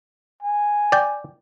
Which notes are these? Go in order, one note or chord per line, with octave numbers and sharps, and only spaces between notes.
G#5
D5 G5